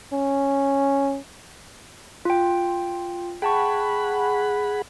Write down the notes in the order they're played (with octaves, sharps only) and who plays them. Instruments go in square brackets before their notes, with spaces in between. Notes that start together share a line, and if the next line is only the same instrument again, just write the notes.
[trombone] C#4
[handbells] F4 G5
[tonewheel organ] G#4 F#5 B5 [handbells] G5 A5 C#6